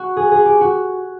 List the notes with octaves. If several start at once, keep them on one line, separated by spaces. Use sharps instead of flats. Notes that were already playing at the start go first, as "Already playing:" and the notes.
Already playing: F#4
G#4
G#4
G4
F#4